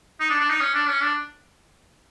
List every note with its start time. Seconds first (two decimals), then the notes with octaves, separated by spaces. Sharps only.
0.20 D#4
0.30 D4
0.40 D4
0.50 D#4
0.60 C#4
0.74 D4
0.88 C#4
1.02 D4